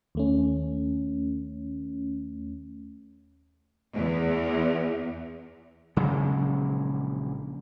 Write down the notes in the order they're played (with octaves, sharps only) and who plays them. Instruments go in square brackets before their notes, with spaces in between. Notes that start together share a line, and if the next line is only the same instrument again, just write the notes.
[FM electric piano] D#2 A3 C#4
[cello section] E2
[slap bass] A#1 C#3 F#3 G#3